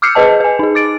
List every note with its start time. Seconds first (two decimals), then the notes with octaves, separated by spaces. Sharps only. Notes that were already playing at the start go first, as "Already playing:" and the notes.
0.02 D6 E6 F6 G6 C7 C#7
0.15 G#4 B4 D#5 A5
0.40 B4 G#5
0.59 D#4 G#4
0.75 D6 A6 D7